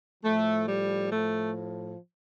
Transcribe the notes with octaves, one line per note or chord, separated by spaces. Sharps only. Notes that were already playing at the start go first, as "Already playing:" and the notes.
A2 F3 A3
G3
A2 F3 A3